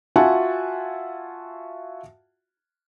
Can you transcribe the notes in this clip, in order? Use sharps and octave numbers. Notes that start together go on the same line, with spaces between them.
F4 F#4 E5 F#5 G#5 A5